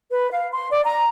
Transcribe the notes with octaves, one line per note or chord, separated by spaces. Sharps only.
B4
F5
C6
D5
A#5